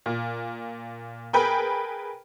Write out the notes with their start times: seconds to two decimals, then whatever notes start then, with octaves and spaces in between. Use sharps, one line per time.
0.06 A#2
1.33 G#4 A#4 B4 G5 B5